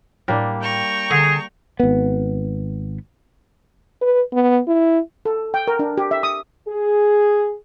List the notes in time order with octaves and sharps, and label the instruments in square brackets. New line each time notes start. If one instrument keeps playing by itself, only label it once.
[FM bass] A2 [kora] G3 A#3 D4
[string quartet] G5 A#5 C#6
[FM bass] D3 [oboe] G#4
[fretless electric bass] G#1 B3
[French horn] B4
B3
E4
[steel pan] A4
G5
A#4
D4
G4
E5
D#6
[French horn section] G#4